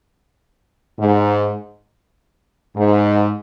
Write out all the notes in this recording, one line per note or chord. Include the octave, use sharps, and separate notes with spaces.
G#2
G#2